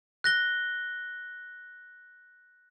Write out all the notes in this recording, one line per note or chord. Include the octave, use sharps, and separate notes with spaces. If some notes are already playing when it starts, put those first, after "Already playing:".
F#6 A#6 G7